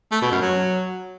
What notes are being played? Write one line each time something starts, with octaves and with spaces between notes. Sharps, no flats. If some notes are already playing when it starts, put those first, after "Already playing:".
A3
B2
F#2
F#3